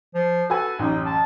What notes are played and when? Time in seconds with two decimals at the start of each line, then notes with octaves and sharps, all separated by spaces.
0.14 F3
0.50 F#4 A4 B4 G#5
0.79 A1 F#2 D#4
1.05 A5